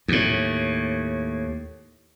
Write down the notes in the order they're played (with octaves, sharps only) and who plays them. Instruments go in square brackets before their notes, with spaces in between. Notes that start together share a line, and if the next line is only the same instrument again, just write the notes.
[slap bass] D#2 A2